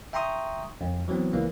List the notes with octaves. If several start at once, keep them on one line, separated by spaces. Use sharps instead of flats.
E5 G5 A#5 C6 C#6 D#6
F2
E3 F#3 B3 C4
C#2 E3 A#3